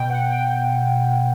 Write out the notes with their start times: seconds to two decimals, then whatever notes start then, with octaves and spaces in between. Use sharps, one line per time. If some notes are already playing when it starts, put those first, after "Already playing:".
Already playing: B2 G5
0.10 F#5
0.30 G5